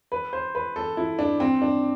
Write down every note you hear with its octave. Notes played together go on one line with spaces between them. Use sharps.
B4
C5
B4
A4
E4
D4
C4
D4